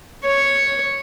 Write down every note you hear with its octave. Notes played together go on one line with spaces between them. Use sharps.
C#5